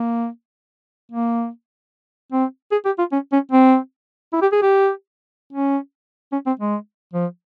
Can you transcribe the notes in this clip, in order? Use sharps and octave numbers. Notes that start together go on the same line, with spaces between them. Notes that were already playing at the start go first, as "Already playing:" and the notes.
Already playing: A#3
A#3
C4
G#4
G4
F4
C#4
C#4
C4
E4
G4
G#4
G4
C#4
C#4
C4
G#3
F3